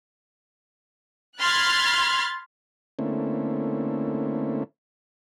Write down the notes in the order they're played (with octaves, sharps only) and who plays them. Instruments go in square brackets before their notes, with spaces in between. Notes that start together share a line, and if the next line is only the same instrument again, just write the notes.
[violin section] B5 C6 F6 F#6 G#6 A6
[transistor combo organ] D3 A3 A#3 C4 C#4 E4